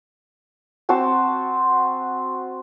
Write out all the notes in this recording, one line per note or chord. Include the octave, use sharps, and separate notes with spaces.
C4 F#4 C5 A5